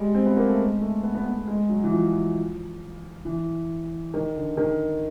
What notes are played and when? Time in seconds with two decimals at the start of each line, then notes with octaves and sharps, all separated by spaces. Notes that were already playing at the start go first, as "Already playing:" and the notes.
Already playing: G3 G#3
0.14 C4
0.26 B3
0.37 A#3
0.48 A3
0.59 G#3
0.81 A3
1.03 B3
1.15 B3
1.26 B3
1.47 G#3
1.69 F#3
1.84 E3
1.92 F3
3.25 E3
4.14 D#3
4.36 D3
4.57 D#3